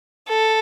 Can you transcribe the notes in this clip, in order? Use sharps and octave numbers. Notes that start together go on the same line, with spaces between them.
A4